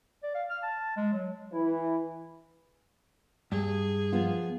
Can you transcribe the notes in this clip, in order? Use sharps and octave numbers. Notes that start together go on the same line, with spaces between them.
D5
F5
F6
A5
G#3
F#3
E3 E4
G2 G#4
F3 B3 F4